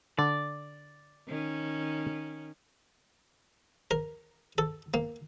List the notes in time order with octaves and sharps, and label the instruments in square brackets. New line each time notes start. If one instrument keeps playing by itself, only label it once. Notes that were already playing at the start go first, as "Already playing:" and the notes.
[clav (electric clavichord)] D3 [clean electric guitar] D5
[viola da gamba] D#3 C#4
[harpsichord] A#4
A4
A#3